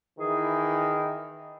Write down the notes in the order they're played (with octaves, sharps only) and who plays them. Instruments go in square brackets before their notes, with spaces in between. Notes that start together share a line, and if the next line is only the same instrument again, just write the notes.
[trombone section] D#3 E3 [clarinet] G#4